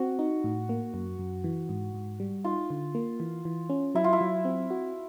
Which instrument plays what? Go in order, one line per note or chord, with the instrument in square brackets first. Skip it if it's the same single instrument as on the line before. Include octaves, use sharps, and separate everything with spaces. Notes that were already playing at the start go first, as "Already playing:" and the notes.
Already playing: [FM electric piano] C4 [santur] F#4
[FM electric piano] D#4
A2
A#3
F#2
F#2
E3
G#2
G#2
G3
[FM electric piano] D#4 [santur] F4
[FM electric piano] D3
A#3
E3
E3
C#4
[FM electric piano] F#3 [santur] E4
[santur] F4
E4
[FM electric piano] F#3
C4
F#4